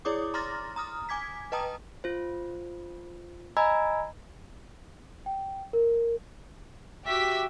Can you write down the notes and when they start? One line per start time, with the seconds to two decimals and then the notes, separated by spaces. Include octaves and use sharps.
0.05 E4 G#4 C#5 D5 D6 D#6
0.34 A#5 C6 D6 F6 A6 A#6
0.76 A#5 D#6 F6
1.09 G#5 D6 G#6 B6
1.52 B4 D#5 G5 A5 A#5 D#6
2.04 F4 C5
3.57 D#5 G#5 A#5 B5 E6 G#6
5.26 G5
5.73 A#4
7.06 F#4 G4 E5 B6